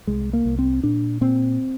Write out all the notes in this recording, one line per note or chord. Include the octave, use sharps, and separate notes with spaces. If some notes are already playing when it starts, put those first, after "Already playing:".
C2 G#3
A#3
C2
C4
A#2 D4
A#2 C4